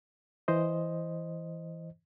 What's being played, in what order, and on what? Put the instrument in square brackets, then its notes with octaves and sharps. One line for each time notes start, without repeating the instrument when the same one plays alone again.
[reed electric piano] E3 C5 D#5